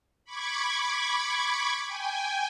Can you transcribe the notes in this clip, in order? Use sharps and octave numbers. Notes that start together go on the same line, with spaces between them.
B5 C#6 D6 G#6
G5 G#5